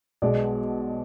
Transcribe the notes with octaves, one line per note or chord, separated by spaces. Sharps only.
B1 B2 G#3 D5